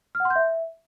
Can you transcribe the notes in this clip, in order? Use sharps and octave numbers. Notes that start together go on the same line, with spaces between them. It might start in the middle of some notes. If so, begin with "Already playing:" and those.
F6
F#5
C6
G6
E5